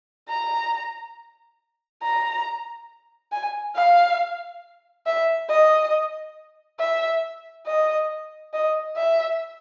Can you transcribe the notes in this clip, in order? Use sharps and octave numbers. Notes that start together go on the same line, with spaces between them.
A#5
A#5
G#5
F5
E5
D#5
E5
D#5
D#5
E5